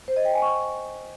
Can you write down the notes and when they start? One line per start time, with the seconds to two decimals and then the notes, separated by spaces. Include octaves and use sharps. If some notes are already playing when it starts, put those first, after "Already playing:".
0.08 C5
0.16 D#5
0.25 G5
0.34 G#5
0.42 C#6